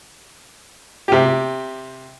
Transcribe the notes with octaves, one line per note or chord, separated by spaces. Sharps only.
C3 G4